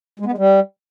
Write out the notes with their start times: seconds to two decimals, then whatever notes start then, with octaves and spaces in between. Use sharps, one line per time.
0.20 G#3
0.26 B3
0.32 G#3
0.38 G3